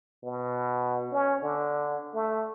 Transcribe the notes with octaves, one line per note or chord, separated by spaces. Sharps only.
B2
C#4
D3
A3